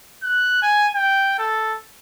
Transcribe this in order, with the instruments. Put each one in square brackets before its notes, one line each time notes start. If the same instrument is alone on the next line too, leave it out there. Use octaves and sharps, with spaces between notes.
[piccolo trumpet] F#6
G#5
G5
A4